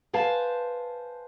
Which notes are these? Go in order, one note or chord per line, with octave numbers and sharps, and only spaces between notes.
B4 C5 F5 G#5 A5